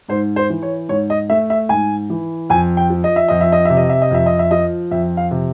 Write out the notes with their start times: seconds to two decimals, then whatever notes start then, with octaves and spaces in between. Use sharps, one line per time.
0.08 G#2 C5
0.36 C5
0.50 E3
0.62 C#5
0.89 G#2 C#5
1.10 D#5
1.30 A3 E5
1.50 E5
1.69 G#2 G#5
2.10 E3
2.50 F2 G#5
2.77 G5
2.90 F3
3.04 D#5
3.16 E5
3.28 F2 D#5
3.41 E5
3.52 D#5
3.65 C3 E5
3.77 D#5
3.89 E5
4.02 D#5
4.11 F2 E5
4.26 D#5
4.39 E5
4.51 F3 D#5
4.91 F2 E5
5.17 F5
5.31 C3